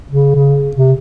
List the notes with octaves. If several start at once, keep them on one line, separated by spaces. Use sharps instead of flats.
C#3
C#3
C3